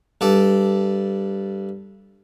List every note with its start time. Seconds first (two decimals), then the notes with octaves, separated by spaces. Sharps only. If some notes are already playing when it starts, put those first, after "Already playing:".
0.21 G2 A4 D5